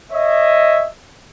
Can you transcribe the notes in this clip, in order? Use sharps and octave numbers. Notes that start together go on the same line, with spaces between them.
C#5 D#5 E5